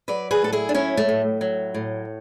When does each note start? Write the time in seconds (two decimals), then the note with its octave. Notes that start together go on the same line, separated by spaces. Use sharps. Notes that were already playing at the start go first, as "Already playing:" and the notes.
0.08 F#3 B4 D5
0.31 G#4 B4
0.42 A2 A4
0.53 E4 G#4
0.69 D4
0.74 F#3 C#4 E4
0.97 A3
1.09 A2
1.41 F#3
1.74 A2